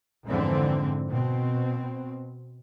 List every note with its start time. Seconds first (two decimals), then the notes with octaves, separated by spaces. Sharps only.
0.27 F2 G#2 D3 E3 C4
1.12 B2 C4